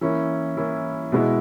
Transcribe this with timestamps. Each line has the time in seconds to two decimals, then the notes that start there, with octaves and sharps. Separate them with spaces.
0.01 E3 A#3 C#4 E4
0.57 E3 A#3 C#4 E4
1.12 B2 G#3 B3 E4